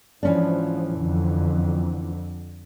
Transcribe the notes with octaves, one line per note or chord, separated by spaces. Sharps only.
G#2 E3 F3 C#4 D4
F2 D3